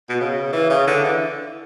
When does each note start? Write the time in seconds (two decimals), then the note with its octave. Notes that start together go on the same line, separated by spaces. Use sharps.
0.09 B2
0.20 C#3
0.53 E3
0.70 C#3
0.87 D3
1.04 E3